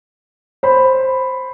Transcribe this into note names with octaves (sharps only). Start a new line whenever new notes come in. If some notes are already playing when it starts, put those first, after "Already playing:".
C5 B5